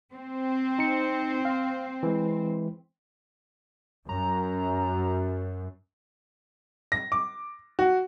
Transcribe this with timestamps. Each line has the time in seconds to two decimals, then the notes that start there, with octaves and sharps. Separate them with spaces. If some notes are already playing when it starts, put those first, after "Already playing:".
0.13 C4
0.79 D#4 C#7
1.45 F5
2.03 E3 G#3
4.09 F#2 A#5
6.92 A#6
7.12 D6
7.79 F#4